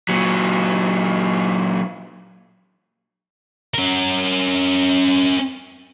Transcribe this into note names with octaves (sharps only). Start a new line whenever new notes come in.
A#2 F#3
C#4 A#4